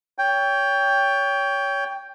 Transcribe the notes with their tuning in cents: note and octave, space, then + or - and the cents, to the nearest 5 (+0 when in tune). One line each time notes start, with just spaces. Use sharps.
C#5 +25 G5 +10